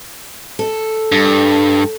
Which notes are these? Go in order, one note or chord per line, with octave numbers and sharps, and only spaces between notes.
A4
G2